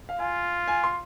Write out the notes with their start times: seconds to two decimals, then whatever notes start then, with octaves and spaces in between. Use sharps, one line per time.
0.09 F5
0.19 F4 G#5
0.68 G#5
0.84 C6